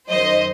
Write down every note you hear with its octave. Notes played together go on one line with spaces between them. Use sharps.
F#2 D#3 F#3 C5 D#5